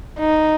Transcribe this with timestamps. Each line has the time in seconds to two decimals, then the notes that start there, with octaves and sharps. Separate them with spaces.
0.19 D#4